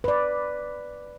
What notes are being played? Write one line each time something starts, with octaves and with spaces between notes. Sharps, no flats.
B4 D5